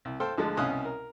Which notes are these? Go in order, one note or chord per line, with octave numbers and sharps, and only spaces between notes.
C2
A4 C5 F5 G5
D2 D3 F3 G#3
C2 B2 C#4 F5 D#6 F#6
A#4